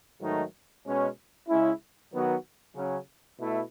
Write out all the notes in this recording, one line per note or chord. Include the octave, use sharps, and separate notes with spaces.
G#2 D#3 F#3 A3 D#4
B2 G#3 C#4
C#3 G#3 C#4 E4
D#3 F#3 B3 F#4
C#3 F#3 C#4
B2 A3 E4